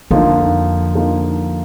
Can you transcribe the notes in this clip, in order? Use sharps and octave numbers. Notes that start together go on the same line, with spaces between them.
F2 D3 F3 A#3 D#4
D3 F3 A#3 D#4